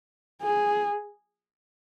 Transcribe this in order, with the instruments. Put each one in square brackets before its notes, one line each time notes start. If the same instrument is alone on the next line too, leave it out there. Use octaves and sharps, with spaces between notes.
[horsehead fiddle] G#4